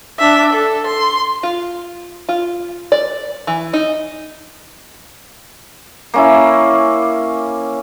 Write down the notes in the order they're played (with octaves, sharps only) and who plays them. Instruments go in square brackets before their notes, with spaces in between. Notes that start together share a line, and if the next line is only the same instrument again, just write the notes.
[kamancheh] D4 E5
A4
C6
[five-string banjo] F4
F4
D5
E3
D#4
[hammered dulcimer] A#3 C#4 E4